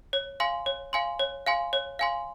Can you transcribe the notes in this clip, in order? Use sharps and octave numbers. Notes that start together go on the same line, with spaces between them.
C#5
F5 G#5 C6
C#5
F5 G#5 C6
C#5
F5 G#5 C6
C#5
F5 G#5 C6